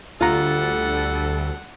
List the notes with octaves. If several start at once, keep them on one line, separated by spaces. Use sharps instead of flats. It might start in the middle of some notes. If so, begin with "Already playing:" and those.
D2 G3 F4 A4 F#5 A#5